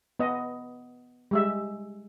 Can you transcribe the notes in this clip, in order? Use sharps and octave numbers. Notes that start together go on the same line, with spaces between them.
B3 D#5
G3 G#3 E5